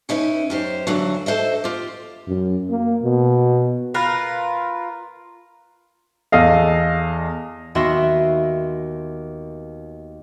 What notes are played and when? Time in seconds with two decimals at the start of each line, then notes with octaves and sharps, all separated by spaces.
0.09 C#4 D#4 E4 B4
0.50 F#2 G4 C5
0.87 G2 D3 E3 F#3
1.26 A4 C5 D#5 E5
1.64 F4 G4
2.27 F#2
2.70 A#3
3.03 B2
3.94 F4 A#4 B4
6.32 E2 A4 D#5 F5
7.75 D#2 B3 F#4 E5 C6 A#6